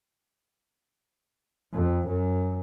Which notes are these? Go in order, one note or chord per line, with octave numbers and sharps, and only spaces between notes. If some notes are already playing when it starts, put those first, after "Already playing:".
F2
F#2